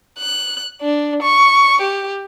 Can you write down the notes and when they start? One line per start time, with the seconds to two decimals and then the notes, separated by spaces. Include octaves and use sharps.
0.20 F#6
0.82 D4
1.22 C#6
1.81 G4